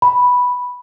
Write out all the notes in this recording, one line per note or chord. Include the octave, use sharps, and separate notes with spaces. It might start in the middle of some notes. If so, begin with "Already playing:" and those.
B5